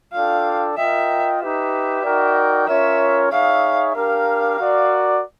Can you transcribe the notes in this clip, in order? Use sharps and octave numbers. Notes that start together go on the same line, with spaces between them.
D4 F4 A4 D5 F5 G5
F4 A#4 D#5 E5 G5
D#4 G4 B4 E5
D#4 F#4 A#4 D5 G5
C#4 F4 A#4 C#5 E5
D#4 G#4 C#5 E5 F5
D4 G4 A#4 F5
F#4 A#4 D5